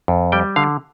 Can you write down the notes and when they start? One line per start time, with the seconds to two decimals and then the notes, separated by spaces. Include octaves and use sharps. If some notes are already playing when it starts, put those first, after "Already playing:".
0.08 F2
0.32 G3 G5
0.56 D3 F5